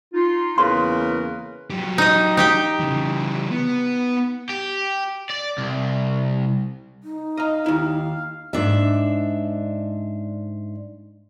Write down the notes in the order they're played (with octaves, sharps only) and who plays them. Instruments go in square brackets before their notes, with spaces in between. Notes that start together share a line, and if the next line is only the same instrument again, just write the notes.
[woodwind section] D#4 F4
[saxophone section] E2 C#3 A#3 [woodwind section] A#4 B4 [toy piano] C6
[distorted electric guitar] F#3 G4
[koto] D#4 D#5
D#4 G4 G5
[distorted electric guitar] C#3 E3
B3
[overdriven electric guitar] G4
D5
C2
[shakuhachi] D#4
[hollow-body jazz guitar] D#5 A#5 [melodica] F5
[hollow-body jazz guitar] D#2 E4
[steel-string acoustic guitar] G#2 D4 E5